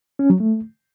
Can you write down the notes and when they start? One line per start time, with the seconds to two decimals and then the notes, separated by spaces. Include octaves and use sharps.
0.19 C#4
0.30 F#3
0.40 A3